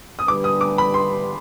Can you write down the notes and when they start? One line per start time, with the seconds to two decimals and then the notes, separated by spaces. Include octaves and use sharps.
0.19 D#6
0.28 D3 G3 D4 G4 B4 D6
0.44 D#6
0.61 D6
0.78 B5
0.94 C6